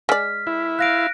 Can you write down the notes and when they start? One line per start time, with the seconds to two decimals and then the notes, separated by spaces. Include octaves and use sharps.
0.09 G#3 D5 F6 B6
0.47 E4
0.79 F5 F#6 A#6 D7